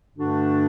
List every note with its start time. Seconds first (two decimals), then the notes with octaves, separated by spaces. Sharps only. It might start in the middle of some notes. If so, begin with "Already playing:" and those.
0.14 G2 D3 A3 D4 F#4